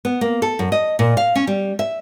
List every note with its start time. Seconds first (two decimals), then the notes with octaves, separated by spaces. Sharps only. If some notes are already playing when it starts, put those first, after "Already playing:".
0.05 B3
0.21 A#3
0.42 A4
0.59 F#2
0.72 D#5
0.99 A#2
1.17 F5
1.36 C#4
1.47 G3
1.79 E5